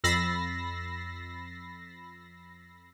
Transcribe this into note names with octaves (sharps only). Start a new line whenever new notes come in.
F2 B5 E6 A6 A#6 C7